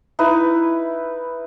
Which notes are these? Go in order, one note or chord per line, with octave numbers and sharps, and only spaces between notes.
D#4 E4 B4